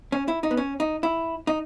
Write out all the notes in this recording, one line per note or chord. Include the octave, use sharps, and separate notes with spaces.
C#4
E4
D#4
B3
C#4
D#4
E4
D#4